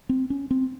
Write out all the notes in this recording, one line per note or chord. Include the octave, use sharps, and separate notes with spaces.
C4
C#4
C4